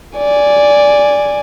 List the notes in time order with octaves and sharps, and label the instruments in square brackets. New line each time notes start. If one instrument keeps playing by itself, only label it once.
[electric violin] D5 G#5